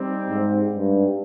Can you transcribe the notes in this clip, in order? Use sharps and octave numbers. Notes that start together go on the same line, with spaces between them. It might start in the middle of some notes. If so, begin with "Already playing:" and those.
Already playing: G3 C4 D#4 G4
G#2
G2